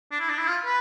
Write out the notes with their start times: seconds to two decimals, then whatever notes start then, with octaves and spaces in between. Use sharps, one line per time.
0.11 D4
0.20 E4
0.29 D4
0.38 E4
0.47 F4
0.66 B4